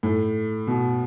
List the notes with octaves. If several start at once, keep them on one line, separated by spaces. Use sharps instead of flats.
A2
B2